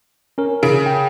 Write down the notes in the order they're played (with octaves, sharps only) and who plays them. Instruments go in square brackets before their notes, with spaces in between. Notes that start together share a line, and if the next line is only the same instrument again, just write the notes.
[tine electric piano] C#4 A#4
[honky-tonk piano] C#3 D7
[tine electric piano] G5